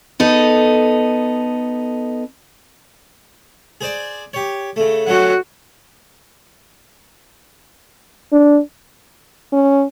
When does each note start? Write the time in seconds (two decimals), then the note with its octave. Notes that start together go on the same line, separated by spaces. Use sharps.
0.20 B3 D#4 A4
3.81 G#4 C5 D5
4.33 G4 C#5
4.76 C#3 A3
5.07 F#3 A3 C#4 F#4 F#5
8.32 D4
9.53 C#4